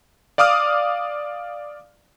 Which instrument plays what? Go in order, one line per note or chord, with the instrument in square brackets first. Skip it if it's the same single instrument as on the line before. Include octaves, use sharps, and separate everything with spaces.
[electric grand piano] D5 F5 D6 D#6 F6